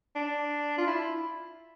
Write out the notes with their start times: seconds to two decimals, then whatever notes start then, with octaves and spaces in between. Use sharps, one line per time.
0.15 D4
0.78 F4
0.87 E4